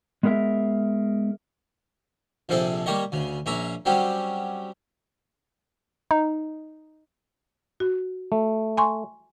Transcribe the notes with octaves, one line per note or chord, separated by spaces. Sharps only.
G#3 B3 G#4 A#4 E5
A#1 C3 F3 C4 G#4 A4
G3 A#3 G4 C#5 D#5
D2 C#3
A#1 A#3 C#4 E5 A#5
F#3 G3 C4 C#4 G4
D#4
F#4
A3
G#5 C6 C#6